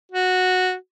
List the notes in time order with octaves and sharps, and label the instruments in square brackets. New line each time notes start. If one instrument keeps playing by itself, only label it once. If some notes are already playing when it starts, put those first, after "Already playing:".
[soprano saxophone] F#4